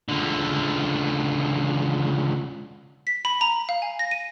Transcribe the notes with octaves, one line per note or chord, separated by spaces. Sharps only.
C#2 D3
B6
B5
A#5
F5
G#5
A#6
D#7